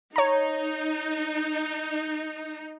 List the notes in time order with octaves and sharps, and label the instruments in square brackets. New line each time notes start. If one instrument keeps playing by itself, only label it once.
[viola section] D#4 [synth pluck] C#5 A#5